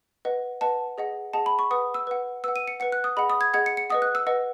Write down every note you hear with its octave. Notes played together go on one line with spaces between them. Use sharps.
B4 D#5 F#5
B4 D#5 F#5 A5
G#4 D#5 F#5
G#4 D#5 F#5 A5
B5
C#6
B4 F#5 D#6
E6
B4 F#5
B4 F#5 E6
D#7
C#7
B4 F#5 C#7
F#6
D#6
G#4 D#5 F#5 B5
D#6
G#6
G#4 D#5 F#5 G#6
C#7
C#7
B4 D#5 F#5 D#6
F#6
E6
B4 D#5 F#5